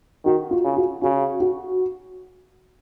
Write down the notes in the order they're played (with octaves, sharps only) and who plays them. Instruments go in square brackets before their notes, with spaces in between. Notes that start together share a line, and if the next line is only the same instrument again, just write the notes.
[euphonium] D#3 [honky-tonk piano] F#4
[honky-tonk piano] F4
[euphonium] C#3
[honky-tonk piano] F#4
[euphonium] C#3 [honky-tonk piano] F#4
[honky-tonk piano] F#4